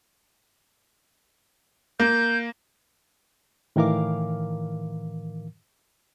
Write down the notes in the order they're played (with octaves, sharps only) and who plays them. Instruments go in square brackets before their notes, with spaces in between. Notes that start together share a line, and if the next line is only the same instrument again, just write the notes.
[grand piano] A#3 [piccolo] G6
[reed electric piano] A2 D#3 E3 A#4 F5 D6